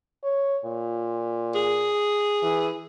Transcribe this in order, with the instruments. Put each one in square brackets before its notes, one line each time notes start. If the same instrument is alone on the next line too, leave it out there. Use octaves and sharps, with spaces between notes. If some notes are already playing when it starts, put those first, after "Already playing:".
[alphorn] C#5
A#2
[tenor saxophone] G#4
[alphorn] E3